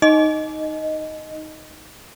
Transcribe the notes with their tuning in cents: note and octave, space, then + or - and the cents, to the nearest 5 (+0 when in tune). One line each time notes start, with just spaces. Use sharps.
D#4 +0 D#5 +0